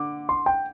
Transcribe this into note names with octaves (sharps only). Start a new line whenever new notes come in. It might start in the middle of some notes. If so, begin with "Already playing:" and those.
Already playing: D3 D6
C6
G5